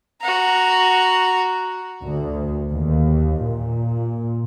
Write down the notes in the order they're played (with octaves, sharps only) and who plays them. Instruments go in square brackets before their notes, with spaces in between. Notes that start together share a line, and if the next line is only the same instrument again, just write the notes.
[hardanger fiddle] F#4 A#5
[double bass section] D2
D#2
A#2